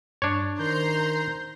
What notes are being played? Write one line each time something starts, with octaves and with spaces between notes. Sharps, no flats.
G2 D4 C#5
D#3 C5 A#5 C6 G6